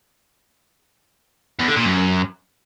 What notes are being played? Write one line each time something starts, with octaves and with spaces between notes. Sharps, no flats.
E2
D3
A#2
F#2